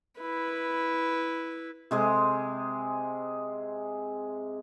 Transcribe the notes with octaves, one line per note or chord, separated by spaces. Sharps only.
E4 B4
C3 G#3 G#4